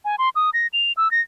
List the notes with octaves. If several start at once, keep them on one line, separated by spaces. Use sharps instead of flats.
G#5
C6
D#6
A#6
F7
E6
A#6